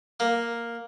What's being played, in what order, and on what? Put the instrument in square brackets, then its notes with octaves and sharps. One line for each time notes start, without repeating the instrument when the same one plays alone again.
[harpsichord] A#3